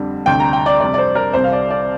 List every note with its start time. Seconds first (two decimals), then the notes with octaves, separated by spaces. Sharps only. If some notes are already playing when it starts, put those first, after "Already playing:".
Already playing: F2 D3 G3
0.26 D2 C3 G3 G5
0.40 A#5
0.53 G5
0.66 D5
0.80 F2 C3 G3 D5
0.94 D5
0.98 C5
1.15 A#4
1.33 C2 C3 G3 C5
1.44 F5
1.53 D5
1.70 D5